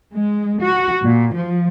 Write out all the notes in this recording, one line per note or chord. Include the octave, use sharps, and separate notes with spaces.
G#3
F#4
A#2
F3